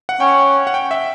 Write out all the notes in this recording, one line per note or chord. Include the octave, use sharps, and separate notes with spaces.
F#5
C#4 G5
F#5
G5
E5